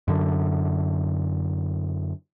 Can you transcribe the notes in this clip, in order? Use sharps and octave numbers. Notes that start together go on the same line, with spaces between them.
F#2 D3